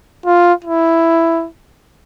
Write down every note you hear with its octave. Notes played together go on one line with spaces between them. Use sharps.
F4
E4